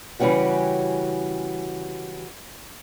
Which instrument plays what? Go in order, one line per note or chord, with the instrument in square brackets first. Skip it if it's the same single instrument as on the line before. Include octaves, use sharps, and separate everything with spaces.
[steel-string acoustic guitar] C#3 E3 G3 C#4 F#4 G4